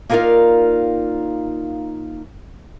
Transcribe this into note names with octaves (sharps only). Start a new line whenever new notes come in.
A#3 D#4 F4 A#4 D5 F5